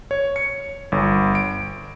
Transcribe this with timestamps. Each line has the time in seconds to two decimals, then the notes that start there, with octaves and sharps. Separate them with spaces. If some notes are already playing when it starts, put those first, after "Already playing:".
0.11 C#5
0.36 C#7
0.92 G1
1.35 D7